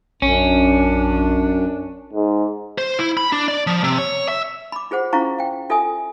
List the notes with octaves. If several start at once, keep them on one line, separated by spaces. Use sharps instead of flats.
A#1 F#2 C#4 D4
G#2
C5
E4
B5
D4
D5
F3
C3
C#5
E5
B5 D6
F4 G#4 C5 F#5
C#4 E4 F4 F5 A#5 C#6
F5 G5
F4 A4 E5 G#5 D#6